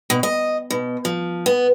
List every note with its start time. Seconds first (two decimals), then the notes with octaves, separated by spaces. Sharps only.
0.10 B2
0.23 D#5
0.71 B2
1.05 F3
1.46 B3